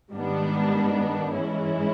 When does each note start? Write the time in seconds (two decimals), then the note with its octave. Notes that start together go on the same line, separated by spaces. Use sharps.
0.11 G#2 D#3 G3 B3 D4
1.32 G#2 E3 G#3 C#4 E4